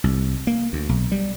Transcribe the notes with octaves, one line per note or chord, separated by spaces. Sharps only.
C2
A#3
D2
B1
G3